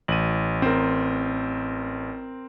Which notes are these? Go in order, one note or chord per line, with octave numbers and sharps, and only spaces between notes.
A1 D#7 F#7
C4 A#4